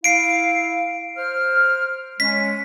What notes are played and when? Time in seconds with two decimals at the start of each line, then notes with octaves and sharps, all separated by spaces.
0.04 E4 F5 C7 D7
1.16 C5 F6
2.20 G#3 C#4 B6